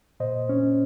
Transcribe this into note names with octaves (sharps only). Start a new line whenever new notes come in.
A#2 C5 D#5
C#4